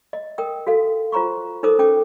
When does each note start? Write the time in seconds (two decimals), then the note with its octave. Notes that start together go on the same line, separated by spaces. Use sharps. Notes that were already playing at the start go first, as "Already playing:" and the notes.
0.13 D#5
0.38 A#4 G5 D#6
0.67 F#4 A4 F5
1.12 F4 C5 A#5 C6 C#6
1.63 D#4 A4 A#4 C5 D6 D#6
1.79 C#4 A4 G5 D6